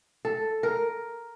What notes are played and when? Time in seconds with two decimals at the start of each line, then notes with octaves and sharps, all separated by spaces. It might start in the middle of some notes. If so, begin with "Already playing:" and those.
0.25 A4
0.63 A#4